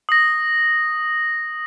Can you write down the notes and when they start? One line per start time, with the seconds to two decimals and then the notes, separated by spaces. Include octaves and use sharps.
0.09 D#6 A#6